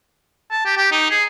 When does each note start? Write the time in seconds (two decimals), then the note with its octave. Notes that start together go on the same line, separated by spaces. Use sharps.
0.51 A5
0.66 G4
0.77 G4
0.92 D#4
1.11 G#4